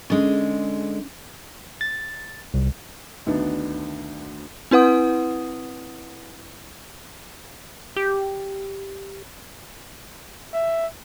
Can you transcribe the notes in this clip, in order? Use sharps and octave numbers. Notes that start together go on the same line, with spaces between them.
D3 G#3 C#4
A6
C2
D2 D#3 B3 D4
C4 E4 B4 F#5 D#6
G4
E5